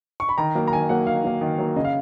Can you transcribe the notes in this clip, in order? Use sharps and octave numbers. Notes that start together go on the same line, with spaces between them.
C#6
B5
D#3 A#5
F#3 A#3
A#5
D#3 G#5
F#3 A#3 F#5
D#3 F5
F#3 A#3
D#3
F#3 A#3
C#3 D#5
F5